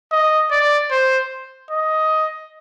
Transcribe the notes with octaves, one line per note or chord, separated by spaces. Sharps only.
D#5
D5
C5
D#5